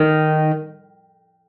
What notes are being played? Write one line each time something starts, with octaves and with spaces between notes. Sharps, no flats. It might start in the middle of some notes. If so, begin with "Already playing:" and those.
Already playing: D#3